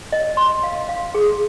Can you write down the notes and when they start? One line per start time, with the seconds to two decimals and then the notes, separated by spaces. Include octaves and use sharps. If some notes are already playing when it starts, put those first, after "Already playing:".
0.12 D#5
0.37 C6
0.63 F5
0.89 F5
1.15 G#4